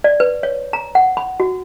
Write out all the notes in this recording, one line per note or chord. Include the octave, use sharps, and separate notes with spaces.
D5
B4
C#5
A#5
F#5
B5
F#4